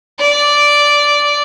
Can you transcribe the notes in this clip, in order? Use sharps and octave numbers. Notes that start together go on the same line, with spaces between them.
D5